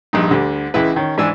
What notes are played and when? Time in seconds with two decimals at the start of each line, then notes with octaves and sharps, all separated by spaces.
0.13 A#1 G2 D#4
0.31 D2 D3 G3
0.74 C#2 E3 G#3 E4 B4
0.96 D#3 C#4
1.18 G#2 E3 D4 G#5 E6